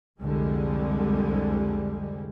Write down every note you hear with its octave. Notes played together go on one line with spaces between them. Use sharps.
C2 F2 D3 G3 G#3